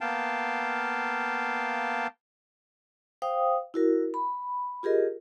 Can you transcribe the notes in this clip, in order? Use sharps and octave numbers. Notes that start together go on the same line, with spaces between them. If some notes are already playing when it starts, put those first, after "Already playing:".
A#3 B3 F5 G5 A5
C5 F5 G5 D#6
E4 F#4 A#4
B5
F4 G4 G#4 A#4 D#5